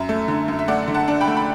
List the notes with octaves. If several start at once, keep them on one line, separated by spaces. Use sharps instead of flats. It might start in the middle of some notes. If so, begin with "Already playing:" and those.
Already playing: F#2 E5
A3
D3
F#2
E5
A3 D5 F#5
D3
F#5 A5
D4
G5 B5
A3
B5